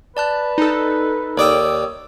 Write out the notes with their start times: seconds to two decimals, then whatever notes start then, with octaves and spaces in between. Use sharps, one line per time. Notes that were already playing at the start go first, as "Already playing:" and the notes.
0.17 B4 D5 A5 F#6
0.58 D#4 A4
1.38 D#2 C#5 D5 G5 D#6 E6